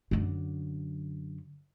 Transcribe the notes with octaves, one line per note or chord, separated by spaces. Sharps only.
F#2 D3